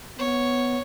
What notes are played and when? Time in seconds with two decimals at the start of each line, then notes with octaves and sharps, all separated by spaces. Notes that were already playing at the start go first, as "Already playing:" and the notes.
0.18 B3 C#5